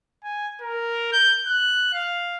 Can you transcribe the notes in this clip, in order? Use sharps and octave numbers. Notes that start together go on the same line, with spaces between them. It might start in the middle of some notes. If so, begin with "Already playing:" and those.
G#5
A#4
G6
F#6
F5